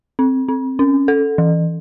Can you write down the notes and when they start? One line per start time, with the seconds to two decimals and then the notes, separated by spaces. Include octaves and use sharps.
0.19 C4
0.48 C4
0.79 C#4
1.08 A4
1.38 E3